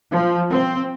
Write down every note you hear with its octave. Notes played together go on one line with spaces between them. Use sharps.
F3
C4